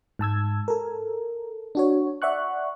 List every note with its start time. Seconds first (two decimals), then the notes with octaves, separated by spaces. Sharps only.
0.19 G#2 A5 E6 G#6
0.68 A4 A#4
1.75 D4 F#4 C#5
2.22 D5 E5 F#5 C#6 F#6